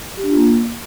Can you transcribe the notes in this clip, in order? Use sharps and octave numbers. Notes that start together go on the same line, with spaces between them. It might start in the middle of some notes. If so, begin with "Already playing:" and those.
G4
D4
F4
A#3